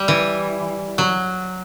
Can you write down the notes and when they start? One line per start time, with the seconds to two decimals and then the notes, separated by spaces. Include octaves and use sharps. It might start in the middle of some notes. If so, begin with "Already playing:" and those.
Already playing: G3
0.08 E3
0.98 F#3